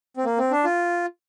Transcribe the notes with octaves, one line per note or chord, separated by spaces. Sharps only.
C4
A#3
C4
D4
F4